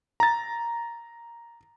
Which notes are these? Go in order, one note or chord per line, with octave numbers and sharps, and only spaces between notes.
A#5 A6